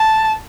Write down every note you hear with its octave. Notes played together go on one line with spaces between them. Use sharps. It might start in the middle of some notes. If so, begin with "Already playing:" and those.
Already playing: A5